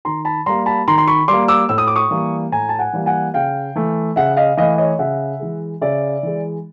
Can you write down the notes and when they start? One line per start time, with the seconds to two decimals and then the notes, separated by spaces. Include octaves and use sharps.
0.05 D#3 A#5 C6
0.25 A5 B5
0.46 G3 A#3 A#5 C6
0.66 A5 B5
0.88 D#3 A#5 C6
0.98 C6
1.07 B5 C#6
1.28 G3 A#3 C6 D6
1.48 D6 E6
1.69 A2 E6
1.78 D#6
1.87 D6
1.96 C#6 D#6
2.11 E3 G3 A#3
2.52 A2 G#5 A#5
2.69 A5
2.79 F#5 G#5
2.93 E3 G3 A#3
3.06 F#5 G#5
3.34 C#3 F5 G5
3.75 E3 A3
4.16 C#3 E5 F#5
4.37 D#5 F5
4.57 E3 A3 D#5 F5
4.78 C#5 D#5
4.99 C#3 E5 F#5
5.40 E3 G#3
5.81 C#3 D5 E5
6.23 E3 G#3